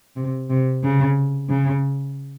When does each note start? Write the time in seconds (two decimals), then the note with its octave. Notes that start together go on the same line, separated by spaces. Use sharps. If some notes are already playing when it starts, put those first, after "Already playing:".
0.16 C3
0.50 C3
0.83 C#3
1.49 C#3